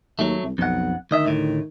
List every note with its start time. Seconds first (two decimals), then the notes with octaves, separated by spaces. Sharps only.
0.19 D#2 F#3 A3
0.43 C2
0.58 B1 F2 F#5
1.11 D2 D#3 D#5 E5
1.25 D2 A2